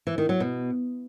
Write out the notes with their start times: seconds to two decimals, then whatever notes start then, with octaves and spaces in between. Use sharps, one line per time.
0.07 E3
0.18 D#3
0.29 F#3
0.40 B2